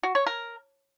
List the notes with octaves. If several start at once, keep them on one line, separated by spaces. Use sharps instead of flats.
F#4
C#5
A#4